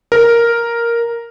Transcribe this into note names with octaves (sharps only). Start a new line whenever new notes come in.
A#4